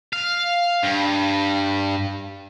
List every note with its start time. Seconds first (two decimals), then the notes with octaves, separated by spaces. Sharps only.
0.13 F5
0.84 G2